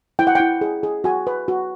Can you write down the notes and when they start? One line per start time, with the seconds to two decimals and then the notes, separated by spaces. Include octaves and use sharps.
0.19 E4 G5
0.27 F#5
0.35 E4 G5
0.61 G#4
0.83 G#4
1.04 F#4 G#5
1.27 B4
1.48 F#4